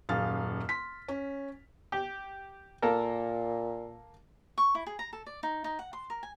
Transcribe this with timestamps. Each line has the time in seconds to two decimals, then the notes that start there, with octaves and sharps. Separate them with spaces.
0.09 D#1 F#2 G#4 F5 F6 A6
0.69 C6 B6
1.08 C#4
1.92 G4
2.82 A#2 A#3 A4 A#4
4.58 C#6
4.75 E4
4.86 G#4
4.99 A#5
5.13 A4
5.26 D5
5.43 D#4
5.64 D#4
5.79 F#5
5.93 C6
6.10 A#4
6.23 G#5